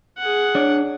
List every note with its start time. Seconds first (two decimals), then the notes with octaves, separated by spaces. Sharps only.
0.18 G#4 F#5
0.55 D4 C#5 D5